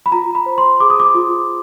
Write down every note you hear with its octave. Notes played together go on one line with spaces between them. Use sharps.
B5
F4 A#5
B5
C5
C6
G#4 D6
D#6
D6
F4